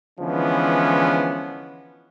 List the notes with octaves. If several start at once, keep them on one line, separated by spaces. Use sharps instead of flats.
D3 E3 F3 G#3 B3 C#4